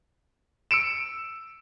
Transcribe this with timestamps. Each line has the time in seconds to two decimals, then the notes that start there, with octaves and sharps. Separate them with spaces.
0.71 E6 C#7 D7 E7